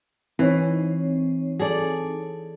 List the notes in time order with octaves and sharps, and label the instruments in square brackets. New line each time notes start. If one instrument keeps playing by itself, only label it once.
[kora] E3 [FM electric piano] C4 D#4 C#5
[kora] G#4 A4 D5